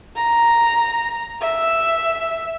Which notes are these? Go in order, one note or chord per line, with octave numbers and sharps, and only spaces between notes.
A#5
E5